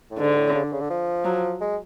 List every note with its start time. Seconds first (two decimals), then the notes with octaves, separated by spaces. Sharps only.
0.11 A2
0.19 G#2 D3
0.37 A2
0.55 C#3
0.63 D3
0.72 C#3
0.81 D3
0.90 F3
1.25 F#3
1.61 G#3